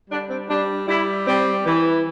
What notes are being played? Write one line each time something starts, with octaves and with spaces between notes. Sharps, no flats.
G3 D4
C4
G3 D4
G3 E4
G3 C4
E3